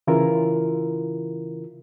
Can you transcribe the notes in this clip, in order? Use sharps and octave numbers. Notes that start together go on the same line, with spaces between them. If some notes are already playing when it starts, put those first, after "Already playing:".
C#3 E3 E4 F4 A#4